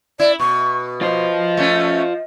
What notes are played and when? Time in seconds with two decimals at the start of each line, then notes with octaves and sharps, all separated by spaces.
0.20 E4 D5
0.40 B2 C#6
1.02 F4 C5 D#5
1.57 A3 C#4